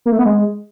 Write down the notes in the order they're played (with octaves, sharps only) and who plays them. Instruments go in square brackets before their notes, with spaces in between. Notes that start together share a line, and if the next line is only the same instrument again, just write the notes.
[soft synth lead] A#3
A3
B3
G#3